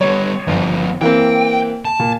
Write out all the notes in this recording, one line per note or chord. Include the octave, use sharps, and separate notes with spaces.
G3 B3 C#5
G1 E2 F3
E3 A#3 C4 G5
A5
A#2